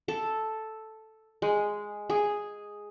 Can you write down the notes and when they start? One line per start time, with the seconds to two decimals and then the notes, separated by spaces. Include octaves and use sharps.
0.08 A4
1.42 G#3
2.10 G#4